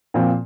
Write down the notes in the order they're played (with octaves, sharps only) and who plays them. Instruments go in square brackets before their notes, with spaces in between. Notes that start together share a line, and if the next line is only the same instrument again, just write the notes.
[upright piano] A#2 F3 C4